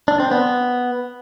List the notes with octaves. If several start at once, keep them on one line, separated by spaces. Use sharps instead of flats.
D4
C4
B3